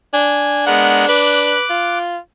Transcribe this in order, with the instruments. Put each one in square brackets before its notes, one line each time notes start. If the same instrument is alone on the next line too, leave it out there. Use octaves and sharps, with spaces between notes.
[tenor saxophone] D4 [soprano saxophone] G#5
[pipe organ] G#3 B3 A#4 [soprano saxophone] F#5
[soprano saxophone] B4 [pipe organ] D6 F#6
[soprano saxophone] F4